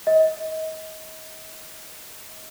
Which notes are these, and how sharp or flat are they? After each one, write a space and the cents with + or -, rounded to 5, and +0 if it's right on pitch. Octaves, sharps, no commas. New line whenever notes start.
D#5 +30